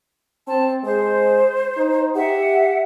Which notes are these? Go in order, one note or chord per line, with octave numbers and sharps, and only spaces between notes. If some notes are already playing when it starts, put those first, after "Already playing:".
C4 A5
G#3 C5
D#4
G4 E5 F#5